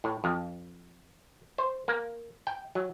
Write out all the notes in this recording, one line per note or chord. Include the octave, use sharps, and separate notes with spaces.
A2
F2
C5
A#3
G5
F#3